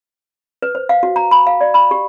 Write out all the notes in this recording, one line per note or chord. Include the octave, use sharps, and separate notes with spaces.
B4
C5
F5
F#4
A#5
B5
F5
D5
B5
G4